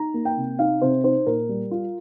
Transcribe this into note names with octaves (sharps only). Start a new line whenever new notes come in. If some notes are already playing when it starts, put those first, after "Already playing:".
Already playing: D#4 A#5
A#3
G5
C3
D#4 F5
C3 C5
D#4 C5
A#2 A#4
G3
F4